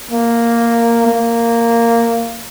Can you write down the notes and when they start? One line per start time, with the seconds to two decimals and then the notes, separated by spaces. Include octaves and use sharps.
0.11 A#3
1.07 A#3